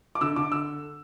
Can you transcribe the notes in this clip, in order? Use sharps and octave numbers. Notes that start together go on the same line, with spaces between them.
D6
D3 E6
D3 D6
E6